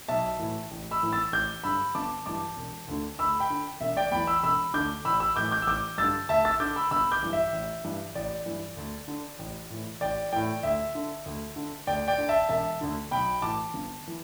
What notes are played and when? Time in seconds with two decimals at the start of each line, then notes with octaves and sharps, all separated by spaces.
0.08 B1 E5 A5
0.39 A2 E3
0.71 A1
0.91 B5 E6
1.02 A2 E3
1.13 E6 A6
1.32 A1 D6 G6
1.64 G2 D3 B5 E6
1.95 G1 A5 D6
2.26 G2 E3 A5 D6
2.57 E1
2.88 D2 D3
3.19 D2 B5 E6
3.40 G5 B5
3.50 D3
3.80 E1 E5
3.97 D5 G5
4.12 E2 E3 G5 B5
4.27 B5 E6
4.43 E1 B5 E6
4.74 D2 D3 D6 G6
5.05 A1 B5 E6
5.20 B5 E6
5.36 A2 E3 D6 G6
5.51 D6 G6
5.62 E6
5.67 A1 D6 G6
5.98 G2 D3 E6 A6
6.29 D2 E5 A5
6.45 E6 A6
6.60 D3 D6 G6
6.76 B5 E6
6.91 G1 B5 E6
7.12 D6 G6
7.23 G2 E3
7.33 E5
7.53 A1
7.84 G2 E3
8.15 A1 D5
8.46 G2 E3
8.77 D2
9.08 D3
9.39 A1
9.70 A2 E3
10.01 A1 D5 G5
10.33 A2 E3 D5 G5
10.63 D2 E5
10.95 D3
11.26 D2
11.56 D3
11.87 D2 D5 G5
12.08 D5 G5
12.18 D3
12.29 E5 A5
12.49 E1 E5 A5
12.81 D2 D3
13.11 B1 G5 B5
13.42 A2 E3 A5 D6
13.74 G1
14.07 E3